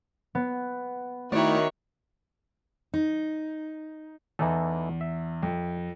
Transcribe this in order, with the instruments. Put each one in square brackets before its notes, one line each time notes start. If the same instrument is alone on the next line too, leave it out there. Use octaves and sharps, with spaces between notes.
[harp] B3
[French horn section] D#3 [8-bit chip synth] A3 E4 [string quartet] F#4 C#5 E5 [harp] D5
[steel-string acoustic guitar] D#4
[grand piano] E2 [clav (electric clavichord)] E3 D#4 A4
[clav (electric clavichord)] E5
[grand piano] F2